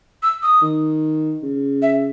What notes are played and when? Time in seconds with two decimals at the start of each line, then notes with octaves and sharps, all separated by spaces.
0.23 E6
0.43 D#6
0.62 D#3
1.43 C#3
1.82 E5